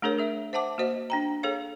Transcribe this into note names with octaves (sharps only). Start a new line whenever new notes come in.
A3 D4 G#4 A#4 C#5
G#4 E5
C5 E5 F#5 A5 D6
A#3 F#4 C5 D#5
D4 G5 A#5
G#4 A4 C#5 F5